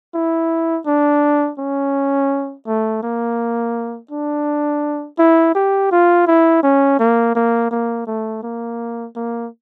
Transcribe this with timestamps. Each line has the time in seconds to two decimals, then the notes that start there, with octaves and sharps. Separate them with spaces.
0.15 E4
0.87 D4
1.59 C#4
2.67 A3
3.03 A#3
4.11 D4
5.19 E4
5.55 G4
5.92 F4
6.27 E4
6.63 C#4
6.99 A#3
7.35 A#3
7.71 A#3
8.07 A3
8.43 A#3
9.16 A#3